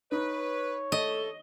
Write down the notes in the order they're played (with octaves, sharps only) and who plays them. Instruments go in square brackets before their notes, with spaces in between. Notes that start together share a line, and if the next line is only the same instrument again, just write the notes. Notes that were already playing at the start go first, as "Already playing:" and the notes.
[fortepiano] D#4 [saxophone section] B4 [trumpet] C#5
[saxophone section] A3 A4 [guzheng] D#5